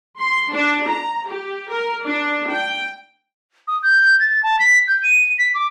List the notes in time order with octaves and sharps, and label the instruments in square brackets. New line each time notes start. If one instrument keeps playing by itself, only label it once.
[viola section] C6
D4
A#5
G4
A#4
D4
G5
[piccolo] D#6
G6
A6
A5
B6
G6
D#7
B6
D6